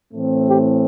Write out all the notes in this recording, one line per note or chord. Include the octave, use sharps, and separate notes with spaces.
A2 E3 A3 C4
G4